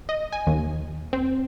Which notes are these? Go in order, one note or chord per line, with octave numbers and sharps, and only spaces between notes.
D#5
G#5
D#2
C4